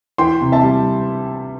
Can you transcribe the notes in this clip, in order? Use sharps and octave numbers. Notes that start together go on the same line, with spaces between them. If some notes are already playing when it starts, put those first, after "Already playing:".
E3 G5 C6
C3
E5 A5
G3